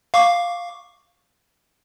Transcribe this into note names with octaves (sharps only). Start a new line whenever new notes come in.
F5 C#6 D6